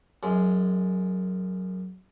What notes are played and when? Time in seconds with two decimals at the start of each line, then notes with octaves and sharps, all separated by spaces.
0.23 F#2 G#3